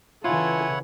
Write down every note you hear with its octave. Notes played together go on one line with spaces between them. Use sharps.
C#3 E3 E4 F4 A4 C#5 F#5 G#5